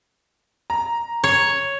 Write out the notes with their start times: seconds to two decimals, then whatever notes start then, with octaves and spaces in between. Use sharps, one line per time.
0.70 A#5
1.24 C#5